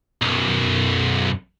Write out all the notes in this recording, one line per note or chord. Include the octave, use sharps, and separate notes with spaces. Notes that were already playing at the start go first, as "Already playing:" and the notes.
B1 F#2